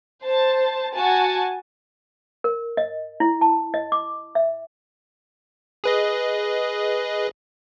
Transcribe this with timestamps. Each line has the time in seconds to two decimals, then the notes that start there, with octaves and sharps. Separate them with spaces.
0.24 C5 A5
0.96 F#4 G#5 A5
2.44 A#4
2.77 D#5
3.20 E4
3.41 A5
3.74 D#5
3.92 D6
4.35 E5
5.84 G#4 B4 D#5